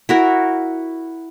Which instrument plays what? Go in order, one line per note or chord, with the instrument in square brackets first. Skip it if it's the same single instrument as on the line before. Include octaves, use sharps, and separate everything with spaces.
[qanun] E4 F#4 A#4